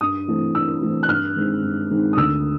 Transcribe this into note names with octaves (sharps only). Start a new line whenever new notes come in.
G2 D#6
E3 A3 C4
G2 E6
E3 A3 C4
F#6
G2 F6
D#3 G#3 C4
G2
D#3 G#3 C4
D#6
D2 E6